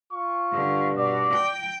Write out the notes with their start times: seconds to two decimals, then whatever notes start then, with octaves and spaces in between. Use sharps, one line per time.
0.12 F4 C#6
0.53 G2 D3
0.96 B2 D5
1.33 G5